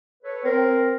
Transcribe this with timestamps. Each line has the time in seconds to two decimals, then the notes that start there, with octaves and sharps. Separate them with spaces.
0.23 A4 B4 C#5
0.45 C4 A#4